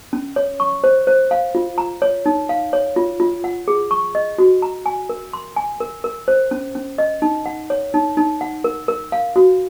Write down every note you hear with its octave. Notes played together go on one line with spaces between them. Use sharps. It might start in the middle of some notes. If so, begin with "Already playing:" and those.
C#4
C#5
C#6
C5
C5
F5
F4
A#5
C#5
D#4
F5
C#5
F4
F4
F#5
G#4
C#6
D#5
F#4
A#5
G#5
A#4
C6
G#5
A#4
A#4
C5
C#4
C#4
D#5
D#4
F#5
C#5
D#4
D#4
F#5
A#4
A#4
F5
F#4